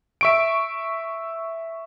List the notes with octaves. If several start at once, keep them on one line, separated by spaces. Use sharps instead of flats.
E5 C#6 D7